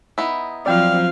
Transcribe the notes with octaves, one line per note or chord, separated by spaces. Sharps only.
B3 D#4 E4
F3 F#3 C4 D5 F5 G5